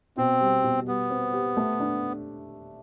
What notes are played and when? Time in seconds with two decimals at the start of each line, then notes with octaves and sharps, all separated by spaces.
0.17 B2 C4
0.41 G3
0.64 B2
0.87 G3 B3
1.10 C4
1.33 G4
1.57 A3
1.80 D4